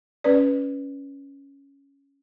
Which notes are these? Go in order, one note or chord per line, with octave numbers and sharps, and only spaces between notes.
C#4 B4 D5